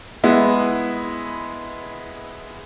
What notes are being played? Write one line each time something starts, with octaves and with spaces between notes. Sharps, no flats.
G#3 B3 E4